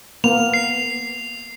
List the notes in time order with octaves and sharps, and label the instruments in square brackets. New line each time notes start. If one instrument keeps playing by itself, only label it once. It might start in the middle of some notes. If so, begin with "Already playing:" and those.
[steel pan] A#3 B3 [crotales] F7
[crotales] C7